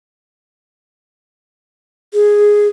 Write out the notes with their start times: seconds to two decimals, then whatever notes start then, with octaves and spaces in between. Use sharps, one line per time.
2.13 G#4